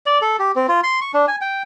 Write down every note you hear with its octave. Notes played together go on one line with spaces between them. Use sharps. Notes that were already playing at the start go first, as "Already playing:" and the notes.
D5
A4
G4
C4
F4
C6
C#6
D4
G#5
G5